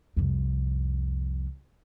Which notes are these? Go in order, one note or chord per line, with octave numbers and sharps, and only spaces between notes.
C2 F2